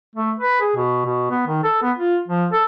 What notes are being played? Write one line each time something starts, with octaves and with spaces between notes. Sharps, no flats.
A3
B4
G#4
B2
B2
B3
D#3
A4
B3
F4
F3
A4